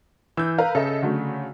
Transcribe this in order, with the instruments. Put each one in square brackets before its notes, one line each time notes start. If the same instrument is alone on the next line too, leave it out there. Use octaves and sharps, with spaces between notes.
[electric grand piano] E3 [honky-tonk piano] E6 G6
[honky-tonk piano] A#4 B4 A#5 [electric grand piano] F5
[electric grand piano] C#3 [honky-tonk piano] A4 D#5 E5
[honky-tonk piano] D3 F#3 A3